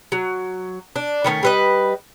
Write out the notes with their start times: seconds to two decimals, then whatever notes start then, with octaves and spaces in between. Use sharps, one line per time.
0.12 F#3
0.96 D4
1.24 D#3 A3 B3 C#4
1.43 G3 B4 D#5